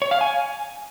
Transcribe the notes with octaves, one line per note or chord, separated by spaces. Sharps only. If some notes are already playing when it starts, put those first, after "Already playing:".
C#5
F5
G#5